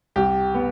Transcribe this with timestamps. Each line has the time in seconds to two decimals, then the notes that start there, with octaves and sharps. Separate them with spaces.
0.16 C2 G4
0.55 B3